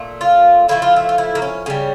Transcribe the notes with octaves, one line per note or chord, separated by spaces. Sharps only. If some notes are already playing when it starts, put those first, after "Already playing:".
Already playing: A#2 A3
F4
A2 F3 A3 E4
F4
E4
F4
E4
A#3
C#4
C#3 G3 C#4